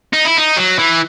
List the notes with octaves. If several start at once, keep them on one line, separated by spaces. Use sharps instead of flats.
D#4
E4
D#4
F#3
E3